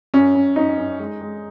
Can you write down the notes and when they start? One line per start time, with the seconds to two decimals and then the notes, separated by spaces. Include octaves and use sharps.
0.14 F#2 C#4
0.35 F#2
0.56 F#2 D#4
0.78 F#2
0.99 G#3
1.21 G#3